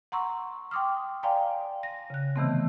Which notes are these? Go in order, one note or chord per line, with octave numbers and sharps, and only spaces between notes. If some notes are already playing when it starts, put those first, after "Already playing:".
F#5 A#5 C6 C#6 E6
G5 C6 D6 D#6 F6
D5 F5 G5 G#5 A#5 C6
A#6
C#3 F#6
C3 D#3 E3 A3 B3 C4